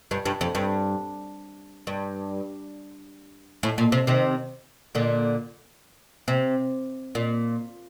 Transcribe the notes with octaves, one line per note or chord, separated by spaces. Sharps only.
G2
G2
F2
G2
G2
A2
A#2
C3
C3 D#3
A#2 D3
C3
A#2